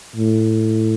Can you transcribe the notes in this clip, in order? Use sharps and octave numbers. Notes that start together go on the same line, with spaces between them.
A2